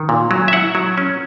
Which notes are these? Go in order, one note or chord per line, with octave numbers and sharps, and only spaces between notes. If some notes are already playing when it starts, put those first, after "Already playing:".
Already playing: D#3
A#2
F#3
E5
E4 F#5
F#3
C#4